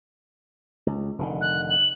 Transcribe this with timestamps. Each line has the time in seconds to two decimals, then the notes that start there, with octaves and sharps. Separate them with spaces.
0.87 C#2
1.19 F1 D3 D#3
1.41 F#6
1.70 F#7